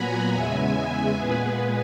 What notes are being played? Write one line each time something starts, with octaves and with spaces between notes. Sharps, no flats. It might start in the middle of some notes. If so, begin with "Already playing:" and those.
Already playing: A#2 F#3 B3 F#5 G#5 A#5 B5
E2 C#3 G#3 B3 E5 G#5
A#2 G#3 B3 G#4 B4